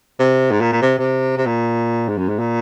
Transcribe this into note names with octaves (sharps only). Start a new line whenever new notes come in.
C3
G#2
A#2
A#2
C3
C3
C3
A#2
G#2
F#2
G#2
A#2